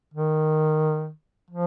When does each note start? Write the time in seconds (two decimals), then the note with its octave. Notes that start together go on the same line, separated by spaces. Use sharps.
0.14 D#3
1.51 F3